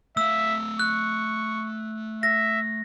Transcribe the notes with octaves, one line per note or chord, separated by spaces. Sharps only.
A3 E5 F5 E6
C#6 F#6
E5 A#6